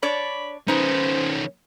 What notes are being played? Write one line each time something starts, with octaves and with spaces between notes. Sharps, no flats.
D4 C#5 D5 B5
D#3 C#4 D#4 B4 C5